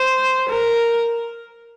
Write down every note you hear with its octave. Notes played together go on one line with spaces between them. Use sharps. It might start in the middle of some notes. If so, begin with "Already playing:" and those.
Already playing: C5
A#4